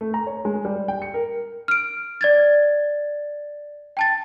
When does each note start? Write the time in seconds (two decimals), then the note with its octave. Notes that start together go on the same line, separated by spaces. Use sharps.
0.01 A3
0.14 A#5
0.27 C#5
0.45 G#3
0.65 G3
0.88 G5
1.02 C#7
1.14 A#4
1.68 F6 D7
2.21 D5 G#6 A6
3.97 G5 A5 A6